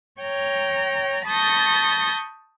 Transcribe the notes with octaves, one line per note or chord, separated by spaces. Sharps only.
C#5 G5 A#5
A5 B5 C#6 D#6 G6 A#6